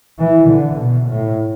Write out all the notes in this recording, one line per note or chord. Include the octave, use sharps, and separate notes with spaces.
E3
D3
B2
A2